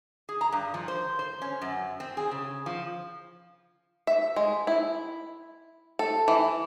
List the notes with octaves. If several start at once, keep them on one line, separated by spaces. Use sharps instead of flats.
G#4
A#5
G2
F3
C5
C5
C#4
F#2
C4
G#4
C#3
F3
E5
G#3
E4
A4
E3